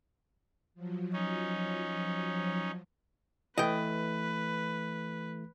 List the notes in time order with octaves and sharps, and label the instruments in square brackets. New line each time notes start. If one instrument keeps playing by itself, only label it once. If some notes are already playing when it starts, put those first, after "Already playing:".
[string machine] F3 F#3
[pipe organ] C#4 D#4
[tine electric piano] E3 A3 [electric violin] B4 [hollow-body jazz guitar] D#5 G5